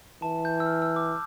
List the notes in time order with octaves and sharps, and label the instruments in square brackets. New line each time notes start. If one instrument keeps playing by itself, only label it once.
[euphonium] E3 [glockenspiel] A5
[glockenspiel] G6
E6
F6
E6
D6